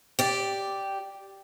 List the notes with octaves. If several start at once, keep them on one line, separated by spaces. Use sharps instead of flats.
G4 D5